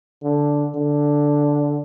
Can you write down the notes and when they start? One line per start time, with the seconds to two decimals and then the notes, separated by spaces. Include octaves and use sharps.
0.23 D3
0.75 D3